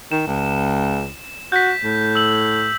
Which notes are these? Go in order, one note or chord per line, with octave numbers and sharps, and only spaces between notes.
D#3 E7
C#2
F#4 G6 B6
A2
E6 F#7